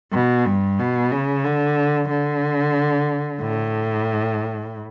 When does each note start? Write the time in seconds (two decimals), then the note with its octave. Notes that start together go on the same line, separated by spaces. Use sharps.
0.13 B2
0.45 G2
0.79 B2
1.11 C#3
1.44 D3
2.10 D3
3.42 A2